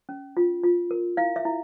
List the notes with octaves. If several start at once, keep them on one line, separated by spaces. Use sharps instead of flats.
C#4
F4
F4
A#4
E4 F5
E5
E4